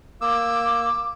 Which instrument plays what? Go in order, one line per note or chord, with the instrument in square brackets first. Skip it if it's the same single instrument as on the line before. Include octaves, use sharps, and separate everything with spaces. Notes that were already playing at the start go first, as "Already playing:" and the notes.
[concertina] A#3 E6 [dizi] D6